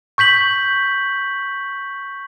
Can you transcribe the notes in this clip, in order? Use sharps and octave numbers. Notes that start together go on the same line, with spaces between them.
C#6 G6 B6 F#7